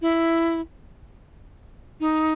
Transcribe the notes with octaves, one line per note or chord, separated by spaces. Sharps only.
E4
D#4